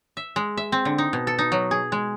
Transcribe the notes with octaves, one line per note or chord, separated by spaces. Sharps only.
E5
G#3
E5
C4
D3
D#4
B2
A4
D#4
F#3
G#4
G#3